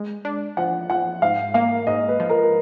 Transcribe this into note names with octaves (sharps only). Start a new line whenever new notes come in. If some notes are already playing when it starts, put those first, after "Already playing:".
Already playing: G#3
D4
F3 F#5
F3 F#5
G#2 F5
A#3 F5
G#2 D#5
B4
F3
A#4